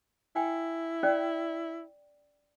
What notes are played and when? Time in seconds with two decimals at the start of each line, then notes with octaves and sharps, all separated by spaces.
0.36 E4 G5 G#5
1.03 C#4 D5 G5